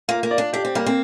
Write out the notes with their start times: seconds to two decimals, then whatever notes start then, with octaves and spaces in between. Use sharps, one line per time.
0.08 A#3 F4
0.23 A#3
0.31 D5
0.38 D4
0.53 D4 G4
0.65 C4
0.75 G3 A#3
0.86 C4